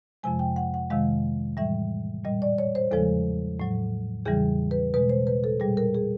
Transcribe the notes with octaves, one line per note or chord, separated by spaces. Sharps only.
F2 C3 F3 G#3 G#5
G5
F#5
F#5
F2 C3 D#3 G#3 F5
A2 E3 G3 E5
A#2 G3 D#5
D5
C#5
C5
E2 C#3 F3 G#3 A4
A2 F#3
E2 C#3 E3 G3 G#4
B4
B2 G#3 B4
C5
B4
A4
A#2 G3 G#4
A#4
G#4